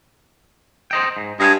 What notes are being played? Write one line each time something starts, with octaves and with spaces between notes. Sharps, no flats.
C5 D#5 G5
G#2
G2 D#5 F5 G#5